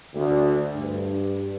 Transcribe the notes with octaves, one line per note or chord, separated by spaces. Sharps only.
D2
G2